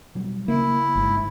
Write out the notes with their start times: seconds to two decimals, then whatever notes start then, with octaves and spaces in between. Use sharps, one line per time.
0.15 B2 F#3 G3
0.48 C#3 A#3 E4
0.95 G1 G#2